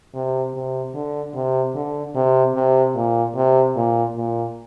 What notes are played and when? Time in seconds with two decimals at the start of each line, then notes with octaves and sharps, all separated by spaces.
0.14 C3
0.54 C3
0.94 D3
1.34 C3
1.75 D3
2.15 C3
2.55 C3
2.95 A#2
3.36 C3
3.76 A#2
4.16 A#2